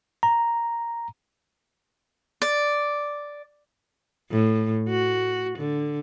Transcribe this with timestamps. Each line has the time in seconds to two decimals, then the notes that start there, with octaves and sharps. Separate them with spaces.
0.23 A#5
2.42 D5
4.31 A2
4.89 F#4
5.58 D3